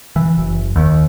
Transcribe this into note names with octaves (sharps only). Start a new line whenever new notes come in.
E3
F#1
D#2